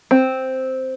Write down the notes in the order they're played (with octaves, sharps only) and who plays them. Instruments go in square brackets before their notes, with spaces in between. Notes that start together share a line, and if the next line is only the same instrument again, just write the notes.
[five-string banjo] C4